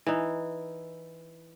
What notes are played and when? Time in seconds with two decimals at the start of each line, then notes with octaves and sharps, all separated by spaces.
0.06 E3 D#4